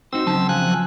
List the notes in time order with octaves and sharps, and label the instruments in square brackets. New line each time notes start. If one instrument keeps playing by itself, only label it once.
[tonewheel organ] C4 E6 [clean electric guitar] D#4 F#4 C5
[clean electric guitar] C#3 F#3 A5
[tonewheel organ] F3 G#5 F#6